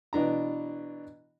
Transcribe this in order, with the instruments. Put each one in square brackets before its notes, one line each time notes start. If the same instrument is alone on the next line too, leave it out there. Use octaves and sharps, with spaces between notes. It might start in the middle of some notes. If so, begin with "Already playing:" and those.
[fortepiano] B2 E3 D4 A#5